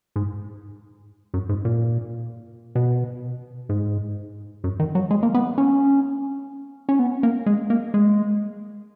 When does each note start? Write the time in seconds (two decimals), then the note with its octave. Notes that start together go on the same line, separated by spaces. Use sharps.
0.16 G#2
1.34 F#2
1.49 G#2
1.65 A#2
2.75 B2
3.69 G#2
4.64 F#2
4.80 D#3
4.95 F#3
5.11 G#3
5.23 A#3
5.34 B3
5.58 C#4
6.89 C#4
6.99 B3
7.23 A#3
7.46 G#3
7.70 A#3
7.94 G#3